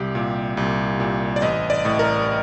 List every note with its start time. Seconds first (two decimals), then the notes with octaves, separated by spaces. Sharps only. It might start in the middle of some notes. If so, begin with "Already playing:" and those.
Already playing: C2 G4
0.15 A#2
0.57 C2
1.00 A#2
1.36 D5
1.42 A1 D#5
1.70 D5
1.85 A2
1.99 A#4